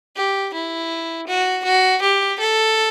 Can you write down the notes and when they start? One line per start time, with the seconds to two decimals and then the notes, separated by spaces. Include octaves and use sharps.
0.17 G4
0.53 E4
1.27 F#4
1.65 F#4
2.02 G4
2.39 A4